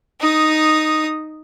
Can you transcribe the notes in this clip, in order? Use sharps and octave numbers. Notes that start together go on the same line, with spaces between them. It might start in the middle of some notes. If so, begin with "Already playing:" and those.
D#4 D#6